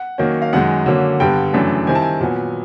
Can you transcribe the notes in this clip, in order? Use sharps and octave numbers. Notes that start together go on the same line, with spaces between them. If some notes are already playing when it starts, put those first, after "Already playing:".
Already playing: F#5
D#3 F#3 A#3 C#4
F5
F#2 D#3 G#3 F#5
D3 F#3 A#3 C#4
G2 D3 G3 B3 G5
F#2 C#3 E3 A3 D4
D#3 G3 C4 E4 G#5
A5
G#5
A#2 F#3 B3